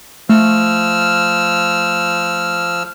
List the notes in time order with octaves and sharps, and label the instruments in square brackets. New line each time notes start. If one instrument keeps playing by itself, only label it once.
[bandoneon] F3 E6 F6 [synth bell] A3